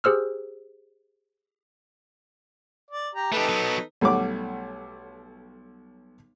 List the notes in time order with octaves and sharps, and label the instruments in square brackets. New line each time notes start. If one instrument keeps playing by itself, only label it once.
[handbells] G4 G#4 C5 E6 F6
[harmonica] D5
G4 A#5
[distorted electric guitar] A3 G4 [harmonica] D#4 A4 B4
[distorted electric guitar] F#3 B3
[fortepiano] B1 G3 A3 C#5 F#5 D6